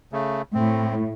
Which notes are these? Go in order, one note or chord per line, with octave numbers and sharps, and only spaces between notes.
C#3 A3
A2 C4